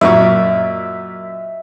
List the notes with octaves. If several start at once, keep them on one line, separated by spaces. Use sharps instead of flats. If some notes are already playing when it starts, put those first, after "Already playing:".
F#2 A#2 E5 C#6